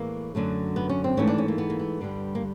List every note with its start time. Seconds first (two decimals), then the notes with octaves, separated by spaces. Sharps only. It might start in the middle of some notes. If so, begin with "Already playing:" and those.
Already playing: A2 E3 G#3 A#3
0.35 F#2 D3 F#3 A3
0.76 B3
0.89 C#4
1.04 C4
1.17 G#2 E3 A3 C#4
1.27 D4
1.38 C#4
1.48 A#3
1.58 B3
1.70 A#3
1.79 B3
2.01 G2 D3 G3
2.35 A#3